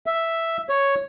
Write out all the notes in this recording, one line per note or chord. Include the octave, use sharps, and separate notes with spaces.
E5
C#5